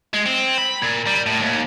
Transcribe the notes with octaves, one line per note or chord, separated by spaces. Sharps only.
G#3
C4
B5
A#2
G3
A2
D#2